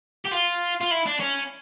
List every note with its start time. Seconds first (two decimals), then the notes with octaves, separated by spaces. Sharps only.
0.25 G4
0.31 F4
0.81 F4
0.91 E4
1.06 D4
1.20 C#4